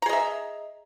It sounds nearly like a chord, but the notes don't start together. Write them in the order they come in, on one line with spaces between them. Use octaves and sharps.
A#5 G#4 D#5 E5